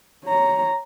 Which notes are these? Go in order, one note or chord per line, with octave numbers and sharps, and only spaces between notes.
C#5 A#5